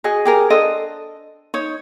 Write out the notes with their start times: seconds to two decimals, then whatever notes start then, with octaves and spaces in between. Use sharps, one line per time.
0.04 F#4 G#4 D#5
0.25 G4 G#4 A#4
0.50 D4 A4 C5 D#5
1.54 D#4 C#5